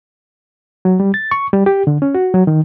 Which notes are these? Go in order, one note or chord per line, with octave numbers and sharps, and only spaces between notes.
F#3
G3
A6
C#6
G3
G4
D3
C#4
F#4
F#3
D#3